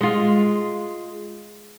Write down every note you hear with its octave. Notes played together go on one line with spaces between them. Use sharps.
G#3 F4